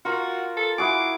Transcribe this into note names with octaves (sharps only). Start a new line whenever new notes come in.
F4 F#4 A#4
A4
E4 F#4 G#4 D6